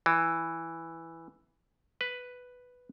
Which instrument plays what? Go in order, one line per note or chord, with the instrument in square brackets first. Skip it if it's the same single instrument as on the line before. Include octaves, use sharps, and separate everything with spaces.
[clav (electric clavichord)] E3
B4